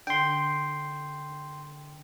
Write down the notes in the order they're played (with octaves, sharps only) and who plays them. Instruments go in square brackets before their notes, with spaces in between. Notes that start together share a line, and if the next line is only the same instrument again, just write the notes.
[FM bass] D3 [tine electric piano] G5 C6